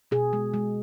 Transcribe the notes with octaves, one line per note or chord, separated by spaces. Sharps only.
B2 G#4
G#3
G#3